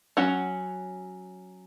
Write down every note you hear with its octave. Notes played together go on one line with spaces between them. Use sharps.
F#3 C#4 F#5